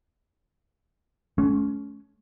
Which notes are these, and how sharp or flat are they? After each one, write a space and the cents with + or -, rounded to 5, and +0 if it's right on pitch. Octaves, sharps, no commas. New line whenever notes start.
A3 -45 C#4 +15